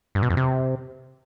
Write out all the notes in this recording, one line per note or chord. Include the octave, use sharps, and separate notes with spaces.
G2
B2
F2
C3